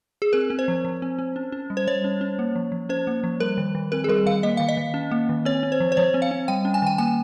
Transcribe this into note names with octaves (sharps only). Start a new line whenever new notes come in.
G#4
C4 A#4
C4
C5
F3
F3
C4
C4
C#4
C#4
G3
C5
G3 C#5
C#4
C#4
A#3
F3
F3
C#4 C5
A#3
F3
G3 A#4
D#3
D#3
C4 A#4
G#4
G3 A#4
D#3 F5
A#3 D#5
D#3 F5
D#5
D#3
C#4
A#3
D#3
C4 C#5
C4
C5
F3
C5
F3 C#5
C4
F5
C4
G3 G5
C#4
G#5
D#3 G5
A#3 G#5